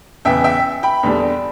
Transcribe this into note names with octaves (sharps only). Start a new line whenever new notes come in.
E2 C#3 E3 E5 G5
E5 G5
G5 B5
E2 D3 G3 D4